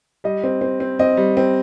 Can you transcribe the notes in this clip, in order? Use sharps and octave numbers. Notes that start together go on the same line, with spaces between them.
G3 D#5
C4
C4
C4
C4 D#5
G3
C4